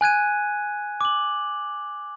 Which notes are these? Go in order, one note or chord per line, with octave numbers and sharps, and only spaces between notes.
G#5 F#6 G#6 D#7
D6 F#7